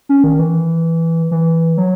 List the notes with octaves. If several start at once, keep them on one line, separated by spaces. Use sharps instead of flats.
C#4
D#3
E3
E3
F#3